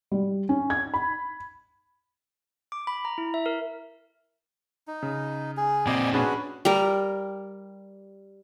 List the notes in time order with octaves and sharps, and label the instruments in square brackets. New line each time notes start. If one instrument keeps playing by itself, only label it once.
[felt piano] G3
C#4
G#6
B5
[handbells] D6
B5
A#5
E4
E5
A#4
[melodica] D#4
[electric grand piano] C#3
[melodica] G#4
[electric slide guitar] A#2 C4 [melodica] D5 D#5 G#5
[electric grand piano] C#4 D4 G#4 [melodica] F#4 B4
[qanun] G3 A#4